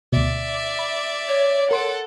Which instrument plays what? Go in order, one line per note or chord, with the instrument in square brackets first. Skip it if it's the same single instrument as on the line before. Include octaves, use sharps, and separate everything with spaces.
[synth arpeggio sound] D2 B2 [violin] D5 E5
[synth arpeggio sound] B5
[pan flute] C#5
[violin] A4 F#5 [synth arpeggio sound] A#4 C6 D7